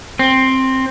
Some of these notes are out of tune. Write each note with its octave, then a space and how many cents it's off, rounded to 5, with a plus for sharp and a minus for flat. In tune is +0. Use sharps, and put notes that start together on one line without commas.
C4 +10